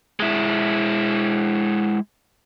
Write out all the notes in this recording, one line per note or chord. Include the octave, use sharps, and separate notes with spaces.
G#3 E4